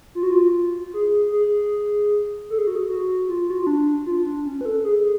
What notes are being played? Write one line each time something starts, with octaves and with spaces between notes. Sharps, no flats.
F4
F#4
F4
G#4
G#4
A4
G#4
F#4
G#4
F#4
F4
F#4
F4
D4
F4
D4
C#4
B4
A4
G#4